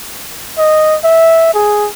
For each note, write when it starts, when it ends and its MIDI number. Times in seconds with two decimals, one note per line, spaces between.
0.58 0.96 75
1.04 1.50 76
1.54 1.88 68